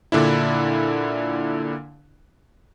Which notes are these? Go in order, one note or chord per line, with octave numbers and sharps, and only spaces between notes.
A#2 D3 D4 E4